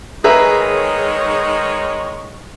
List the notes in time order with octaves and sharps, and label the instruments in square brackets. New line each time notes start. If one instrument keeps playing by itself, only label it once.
[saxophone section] D#3 G#3 C#5 [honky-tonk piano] G#4 A#4 [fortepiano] B4 E5 A#5